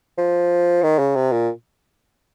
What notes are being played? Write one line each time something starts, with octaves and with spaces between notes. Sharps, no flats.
F3
D#3
C#3
C3
A#2